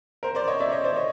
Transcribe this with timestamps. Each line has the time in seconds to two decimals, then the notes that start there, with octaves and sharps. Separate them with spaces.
0.23 A#4 C5
0.35 C5 D5
0.48 C#5 D#5
0.60 D5 E5
0.72 C#5 D#5
0.84 C5 D5
0.96 C#5 D#5